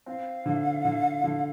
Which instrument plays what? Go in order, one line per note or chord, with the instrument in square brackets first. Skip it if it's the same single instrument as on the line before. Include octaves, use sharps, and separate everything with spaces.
[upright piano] C4 [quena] F5
[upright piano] D3
D3
D3